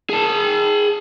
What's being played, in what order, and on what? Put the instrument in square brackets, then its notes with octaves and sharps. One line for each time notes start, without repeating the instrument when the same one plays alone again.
[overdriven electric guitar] G#4 A5